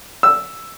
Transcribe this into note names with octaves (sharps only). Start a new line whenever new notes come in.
E6